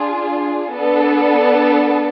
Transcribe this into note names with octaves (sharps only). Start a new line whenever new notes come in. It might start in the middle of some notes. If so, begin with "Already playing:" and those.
Already playing: D4 F4 G#4
B3 D4 A4